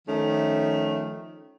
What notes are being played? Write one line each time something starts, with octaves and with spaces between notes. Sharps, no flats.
D#3 F3 A3 C#4